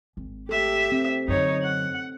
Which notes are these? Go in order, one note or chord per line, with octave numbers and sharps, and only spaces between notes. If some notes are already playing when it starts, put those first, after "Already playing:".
G#1
G4 A4 E5
C4
F#2 D3 D#4 C#5
F#5